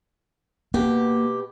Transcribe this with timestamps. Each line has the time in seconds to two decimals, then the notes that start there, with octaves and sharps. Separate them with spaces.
0.74 B2 A#3 G4